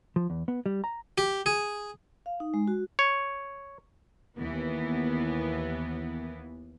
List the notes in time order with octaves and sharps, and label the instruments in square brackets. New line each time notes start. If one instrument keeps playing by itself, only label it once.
[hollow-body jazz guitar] F3
E2
B3
G3
A#5
[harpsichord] G4
G#4
[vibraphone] F5
D#4
G#3
F#4
[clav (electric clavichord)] C#5
[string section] D#2 E3 B3